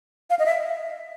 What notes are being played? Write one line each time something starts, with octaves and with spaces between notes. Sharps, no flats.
F5
D#5
E5